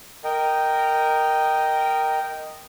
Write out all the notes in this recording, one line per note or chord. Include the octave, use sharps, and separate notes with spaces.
A#4 D#5 G5